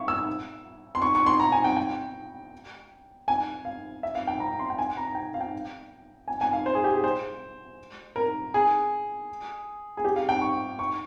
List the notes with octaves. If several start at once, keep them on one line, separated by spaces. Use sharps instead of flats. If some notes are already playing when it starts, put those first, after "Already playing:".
Already playing: E5 F5 C#6
E6
C6
C#6
C#6
C6
A#5
G#5
G5
G5
G#5
F5
E5
F5
G5
A#5
C6
G5
G#5
A#5
G5
F5
G5
G#5
G#5
F5
C5
G#4
G4
G#4
C5
A#4
G#4
G#4
G4
F5
G5
C#6
C#6